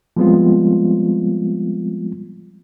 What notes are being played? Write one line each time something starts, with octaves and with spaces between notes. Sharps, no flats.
F3 G3 G#3 B3 C4 F4